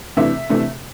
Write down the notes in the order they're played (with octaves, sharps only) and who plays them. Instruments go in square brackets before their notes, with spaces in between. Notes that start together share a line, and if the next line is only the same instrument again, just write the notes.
[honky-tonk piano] C3 E3 A3 D4 E5
C3 E3 A3 D4